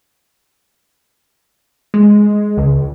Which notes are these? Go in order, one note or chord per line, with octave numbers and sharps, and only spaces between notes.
G#3
C#2